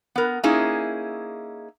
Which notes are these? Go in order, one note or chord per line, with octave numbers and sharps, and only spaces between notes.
B3 A#4
A#3 C#4 D#4 E4 G#4